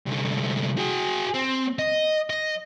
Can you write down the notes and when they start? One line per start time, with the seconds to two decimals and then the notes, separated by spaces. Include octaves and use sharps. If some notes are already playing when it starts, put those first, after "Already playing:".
0.07 C2 D3
0.77 F#4 G#4
1.34 C4
1.79 D#5
2.30 D#5